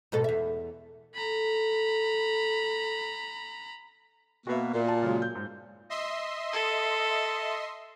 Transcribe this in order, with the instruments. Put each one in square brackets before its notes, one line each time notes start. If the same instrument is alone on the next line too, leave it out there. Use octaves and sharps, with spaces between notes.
[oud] G#2 B2 A4
E2 E5
[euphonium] A4 [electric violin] A#5 B5
[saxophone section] B2 A#3 [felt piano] F#4 B4 E5
[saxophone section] A#2
[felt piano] A5
C#3 F#3 G#3
G6
G#2
[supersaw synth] D#5 E5 C6
[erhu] A4